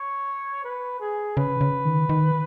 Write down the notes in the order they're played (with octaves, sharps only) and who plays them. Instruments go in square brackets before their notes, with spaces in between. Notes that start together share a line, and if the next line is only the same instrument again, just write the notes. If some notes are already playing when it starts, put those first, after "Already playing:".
Already playing: [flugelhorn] C#5
B4
G#4
[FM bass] C#3 [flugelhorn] B4
[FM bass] C#3
D#3
D#3